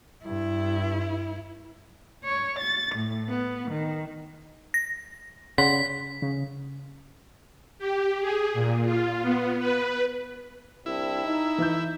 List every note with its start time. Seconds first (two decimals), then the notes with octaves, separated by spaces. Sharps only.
0.25 G2 E4
2.24 C#5
2.59 A6
2.95 A2
3.29 B3
3.71 D#3
4.74 A#6
5.58 C#3 D5 F#5 C6 B6
6.22 C#3
7.79 G4
8.20 G#4
8.54 A#2
8.84 F4
9.22 B3
9.59 B4
10.86 C2 C4 D4 E4
11.25 D#4
11.58 E3 G6